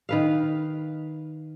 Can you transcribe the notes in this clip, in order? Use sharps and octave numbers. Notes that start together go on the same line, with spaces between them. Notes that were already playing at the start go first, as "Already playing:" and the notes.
D#3 B4 F5